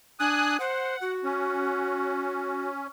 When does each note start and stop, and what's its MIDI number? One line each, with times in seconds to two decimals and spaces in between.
0.20 0.57 62
0.20 0.57 80
0.20 0.57 87
0.20 0.57 90
0.60 0.96 72
0.60 1.13 78
1.01 2.68 66
1.24 2.87 61